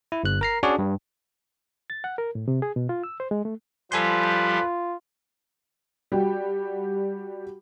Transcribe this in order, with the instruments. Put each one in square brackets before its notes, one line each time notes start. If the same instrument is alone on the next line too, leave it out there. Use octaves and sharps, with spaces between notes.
[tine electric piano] E4
G1 F#6
A#4 A#5 C7
C#4 D4 F#4 G#4 C#5 D5
G2
[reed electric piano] A6
F#5
A#4
A2
C3
G#4
B2
F4
E6
C5
G#3
A3
[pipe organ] F3 G3 G4 [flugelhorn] F4 [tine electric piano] A4 G#5 C6 [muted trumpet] B4
[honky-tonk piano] G3 F#4 G4 G5